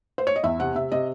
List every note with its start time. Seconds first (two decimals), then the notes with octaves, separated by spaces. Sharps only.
0.18 C5
0.27 C#5
0.36 D#5
0.43 E2 E5
0.60 C3 F#5
0.75 C3 E5
0.92 C3 D#5